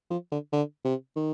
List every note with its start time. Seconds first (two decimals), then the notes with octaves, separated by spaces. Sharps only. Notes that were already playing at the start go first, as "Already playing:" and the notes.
0.11 F3
0.32 D3
0.53 D3
0.85 C3
1.16 D#3